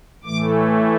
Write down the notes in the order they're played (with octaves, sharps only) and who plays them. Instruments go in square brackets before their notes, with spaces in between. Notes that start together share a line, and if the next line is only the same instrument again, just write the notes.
[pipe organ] A2 E3 A3 D6